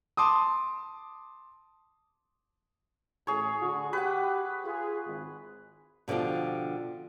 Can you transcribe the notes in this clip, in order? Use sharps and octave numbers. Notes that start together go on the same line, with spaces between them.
A5 C6 D6 D#6
A1 G#4 C#5
D3 F#4
G4 B4 F#5
F4 G#4
G#1
B2 D3 F3 D4 G4